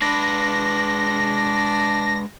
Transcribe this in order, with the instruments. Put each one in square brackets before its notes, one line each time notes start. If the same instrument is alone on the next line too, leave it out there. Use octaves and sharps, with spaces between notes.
[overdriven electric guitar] G#3 B4 [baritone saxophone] D4 [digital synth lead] A#6